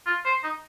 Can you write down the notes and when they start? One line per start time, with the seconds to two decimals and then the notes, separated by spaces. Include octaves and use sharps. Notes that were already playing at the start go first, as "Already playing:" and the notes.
0.07 F4
0.25 C5
0.43 D#4